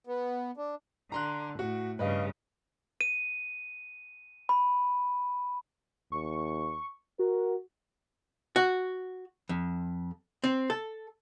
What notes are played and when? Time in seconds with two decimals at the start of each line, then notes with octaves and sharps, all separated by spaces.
0.07 B3
0.57 D4
1.12 D3 A#5 C6 F#6
1.59 A2 F#4
1.99 G2 C#3 B4 D#5 F5
3.01 D#7
4.49 B5
6.12 D#2 C#6
7.19 F#4 A#4
8.56 F#4
9.49 F2
10.44 C4
10.70 A4